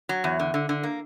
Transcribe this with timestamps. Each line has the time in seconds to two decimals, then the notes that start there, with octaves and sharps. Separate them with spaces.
0.09 F#3
0.24 E2
0.39 D3
0.54 D3
0.69 D3
0.83 A#3